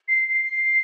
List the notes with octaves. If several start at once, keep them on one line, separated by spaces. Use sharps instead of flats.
C7
C7